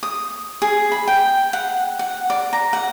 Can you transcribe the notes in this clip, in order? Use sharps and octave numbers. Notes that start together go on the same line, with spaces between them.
D#6
G#4
B5
G5
F#5
F#5
D5
A#5
F#5